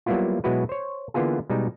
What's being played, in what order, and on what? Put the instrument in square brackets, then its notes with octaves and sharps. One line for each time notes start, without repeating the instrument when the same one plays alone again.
[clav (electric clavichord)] F#3 G3 A#3 B3 E4 F4
B2 F#3 G#3 E4 F#4 B4
C5 C#5
D3 E3 A#3 B3 F4 G#4
B2 G3 G#3 D#4